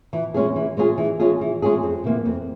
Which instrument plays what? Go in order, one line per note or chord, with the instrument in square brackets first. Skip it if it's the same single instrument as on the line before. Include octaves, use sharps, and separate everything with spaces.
[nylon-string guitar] E3
G#3 C#4 F4 G#4
E3
G#3 C#4 F4 G#4
E3
G#3 C#4 F4 G#4
E3
G#3 C#4 F4 G#4
F2
C3 E3 A#3
F2